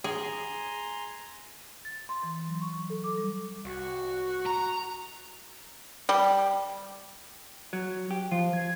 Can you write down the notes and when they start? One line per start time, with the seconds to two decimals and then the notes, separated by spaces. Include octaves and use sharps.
0.04 G#4 G#5 A#5 C6
1.85 A6
2.09 C6
2.23 E3
2.48 F#3
2.61 C#6
2.90 A4
3.04 D6
3.18 G3
3.65 C2 F#4
4.46 A#5
6.09 G3
7.73 F#3
8.11 G4
8.32 F3 F4
8.53 G#6